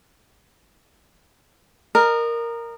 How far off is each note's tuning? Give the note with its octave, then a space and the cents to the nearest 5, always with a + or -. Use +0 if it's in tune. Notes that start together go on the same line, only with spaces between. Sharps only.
A#4 +0 D#5 -25